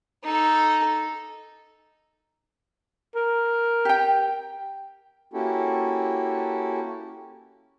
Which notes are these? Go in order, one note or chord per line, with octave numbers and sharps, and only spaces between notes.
D#4 A4
A#4
G4 G5
A#3 C#4 E4 F#4 G4 A4